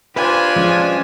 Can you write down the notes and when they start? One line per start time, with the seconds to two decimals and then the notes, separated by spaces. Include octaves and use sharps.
0.16 D4 F4 G4 B4 C5 G#5 F#6
0.56 F3 G#3 C#4